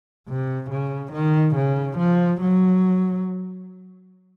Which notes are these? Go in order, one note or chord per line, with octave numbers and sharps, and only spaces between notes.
C3
C#3
D#3
C#3
F3
F#3